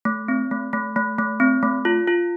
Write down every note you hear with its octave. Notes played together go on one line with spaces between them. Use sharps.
A3
C4
A3
A3
A3
A3
C4
A3
F4
F4